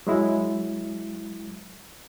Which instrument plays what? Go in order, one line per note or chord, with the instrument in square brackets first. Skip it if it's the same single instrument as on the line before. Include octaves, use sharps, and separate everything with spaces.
[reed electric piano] F#3 G#3 E4